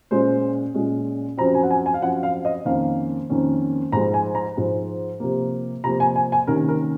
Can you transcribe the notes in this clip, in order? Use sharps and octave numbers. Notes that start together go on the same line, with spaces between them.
A#2 G#3 C#4 C5
A#2 G#3 C#4
F#2 F3 C4 A#5
G#5
F#5
G#5
G#5
F5
F#2 F3 C4 F#5
F5
D#5
F2 D#3 A#3 C#4 F5
F2 D#3 A#3 C#4
G#2 F3 G#3 A#5
G#5
A#5
G#2 F3 G#3
C3 F3 A#3
C3 F3 A#3 A#5
G#5
G#5
G#5
C3 D#3 A#3 C#4 A#4
A#4